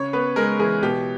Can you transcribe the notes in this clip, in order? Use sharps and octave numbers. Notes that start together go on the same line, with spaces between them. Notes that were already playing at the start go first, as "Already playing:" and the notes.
Already playing: C#3 C#5
B3 B4
G#3 A#4
E3 G#4
B2 G4